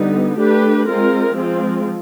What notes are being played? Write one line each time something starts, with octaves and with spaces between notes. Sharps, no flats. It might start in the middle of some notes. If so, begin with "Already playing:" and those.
Already playing: D3 G3 B3 D#4
A3 D4 G4 B4
G#3 C4 F4 A#4
F3 G#3 C4 F4